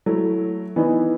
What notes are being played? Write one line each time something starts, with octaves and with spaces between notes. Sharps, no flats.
F#3 A3 E4
E3 B3 D#4